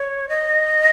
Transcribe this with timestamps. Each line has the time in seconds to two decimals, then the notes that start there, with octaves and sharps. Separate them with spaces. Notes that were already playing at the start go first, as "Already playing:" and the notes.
Already playing: C#5
0.29 D#5